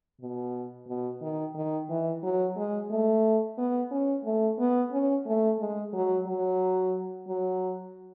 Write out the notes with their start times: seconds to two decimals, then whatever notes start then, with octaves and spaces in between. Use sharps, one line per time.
0.20 B2
0.87 B2
1.22 D#3
1.55 D#3
1.89 E3
2.23 F#3
2.56 G#3
2.90 A3
3.58 B3
3.91 C#4
4.24 A3
4.59 B3
4.92 C#4
5.26 A3
5.59 G#3
5.93 F#3
6.26 F#3
7.27 F#3